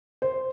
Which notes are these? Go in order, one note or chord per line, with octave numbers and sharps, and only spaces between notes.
C5